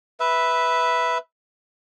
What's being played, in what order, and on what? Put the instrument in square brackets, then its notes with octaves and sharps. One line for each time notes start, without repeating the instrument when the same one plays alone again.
[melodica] B4 E5